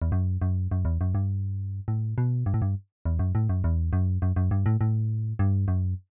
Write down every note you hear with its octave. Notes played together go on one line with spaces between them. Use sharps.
E2
F#2
F#2
F#2
E2
F#2
G2
A2
B2
G2
A2
G2
E2
F#2
A2
F#2
E2
F#2
F#2
F#2
G2
A2
A2
G2
F#2